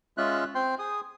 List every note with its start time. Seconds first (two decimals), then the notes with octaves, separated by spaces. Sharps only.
0.18 G#3 C#4 F4 E5 F#6
0.55 C4 G5 C6
0.79 G#4 D#6